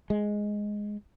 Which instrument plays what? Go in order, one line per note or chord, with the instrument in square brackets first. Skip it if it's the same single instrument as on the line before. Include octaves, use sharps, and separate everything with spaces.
[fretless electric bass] G#3